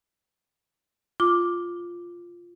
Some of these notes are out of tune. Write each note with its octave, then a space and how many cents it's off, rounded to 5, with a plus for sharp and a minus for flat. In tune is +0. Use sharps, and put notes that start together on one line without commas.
F4 +0 D6 +0